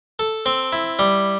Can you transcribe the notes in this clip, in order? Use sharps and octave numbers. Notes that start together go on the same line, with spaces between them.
A4
C4
E4
G3